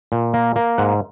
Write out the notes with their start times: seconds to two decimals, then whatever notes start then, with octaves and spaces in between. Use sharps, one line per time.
0.12 A#2
0.34 A#3
0.56 A#3
0.78 G#2 F#5